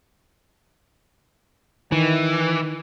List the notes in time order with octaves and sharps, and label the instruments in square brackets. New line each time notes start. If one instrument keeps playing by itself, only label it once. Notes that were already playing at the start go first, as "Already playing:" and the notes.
[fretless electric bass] D#3 [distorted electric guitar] E3